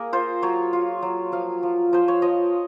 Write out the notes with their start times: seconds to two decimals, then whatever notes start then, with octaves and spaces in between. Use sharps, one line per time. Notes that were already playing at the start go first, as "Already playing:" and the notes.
Already playing: A#3 G#4 A#4
0.13 F4 C5
0.42 F#3 C#5
0.73 F4
1.02 F#3
1.32 F3 F5
1.63 F3
1.93 F3 C5
2.08 C#5
2.22 F3 D#5